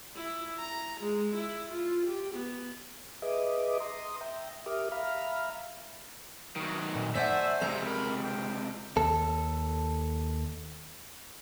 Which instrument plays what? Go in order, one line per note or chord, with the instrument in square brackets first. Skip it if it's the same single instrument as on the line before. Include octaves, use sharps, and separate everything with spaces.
[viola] E4
A#5
G#3
E4
F4
G4
B3
[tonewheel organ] G#4 B4 D#5 E5 D6 D#6
A#5 C6 D#6
E5 G5 A#5
G4 A#4 E5 D6 D#6 F6
E5 F5 A#5 B5 F6
[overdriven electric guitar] D#3 F#3
[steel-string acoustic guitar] A#2
[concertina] A3 C5 G#5 [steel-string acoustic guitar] D5 F#5 [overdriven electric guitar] E5
[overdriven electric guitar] C#2 C3 [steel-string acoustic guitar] G#3 A#5
[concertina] A#4 B5
G5
[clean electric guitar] D#2 A4